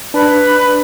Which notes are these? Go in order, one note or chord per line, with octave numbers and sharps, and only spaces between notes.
D4 B4